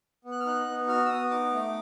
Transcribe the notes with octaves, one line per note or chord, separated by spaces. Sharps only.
B3
F#6
F6
D#4 F#6
B3
F#4 F6
E6
B3 D#6
D#4 D6
A3